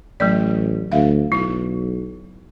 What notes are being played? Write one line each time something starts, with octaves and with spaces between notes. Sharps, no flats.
A1 F#3 A3 D5
D2 E5 F5
B1 E4